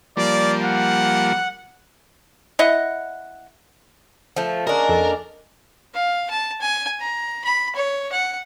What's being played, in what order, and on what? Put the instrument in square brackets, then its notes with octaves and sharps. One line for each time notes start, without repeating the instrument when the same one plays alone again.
[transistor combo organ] F3 G3 A#3 [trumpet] D5
[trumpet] F#5
[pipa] E4 D#5 F#5
[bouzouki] F3 A3
[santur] G#3 C#4 [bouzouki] A#3 D4 [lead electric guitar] A#4
[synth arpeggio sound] F2 A4
[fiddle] F5
A5
G#5
A#5
B5
C#5
F#5